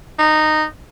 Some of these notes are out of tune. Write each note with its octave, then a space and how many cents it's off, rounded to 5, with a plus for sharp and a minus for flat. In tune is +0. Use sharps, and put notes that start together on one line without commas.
D#4 -10